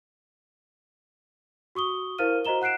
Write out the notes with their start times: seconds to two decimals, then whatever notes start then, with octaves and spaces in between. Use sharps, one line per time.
1.75 F#4 C#6 D#6 G7
2.18 E4 A#4 C5 F5 F6 D#7
2.45 F#4 C5 D#5 A#5 E7 G7
2.62 F#5 F#6 C7 D7 E7